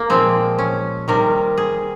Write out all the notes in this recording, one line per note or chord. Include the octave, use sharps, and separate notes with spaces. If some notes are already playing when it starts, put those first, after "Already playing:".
Already playing: A#3
A#2 F3 G#3 C4
C#4
C3 D#3 G3 A#4
G#4